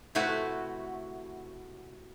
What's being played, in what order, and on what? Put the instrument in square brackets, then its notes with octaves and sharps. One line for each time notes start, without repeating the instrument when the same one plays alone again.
[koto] C3 A3 E4 F#4 B4